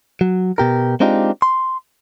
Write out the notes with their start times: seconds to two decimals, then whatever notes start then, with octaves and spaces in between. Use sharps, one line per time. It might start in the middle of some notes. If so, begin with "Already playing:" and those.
0.21 F#3
0.58 B2 G4 A#4
1.00 G#3 C4 D4 D#4 F4 G4
1.42 C6